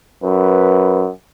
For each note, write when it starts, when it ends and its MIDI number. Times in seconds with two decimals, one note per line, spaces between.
0.24 1.09 42
0.24 0.98 71